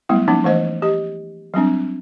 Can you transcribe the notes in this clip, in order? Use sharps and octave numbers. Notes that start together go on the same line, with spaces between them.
F#3 G3 A3 B3 E4
F3 A#3 C#4 D#4
E3 A3 C5 D#5
G4 D#5
F#3 G3 C4 D4